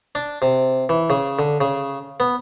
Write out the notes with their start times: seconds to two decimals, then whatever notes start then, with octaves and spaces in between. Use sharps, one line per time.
0.15 D4
0.42 C3
0.89 E3
1.10 C#3
1.39 D3
1.61 C#3
2.20 B3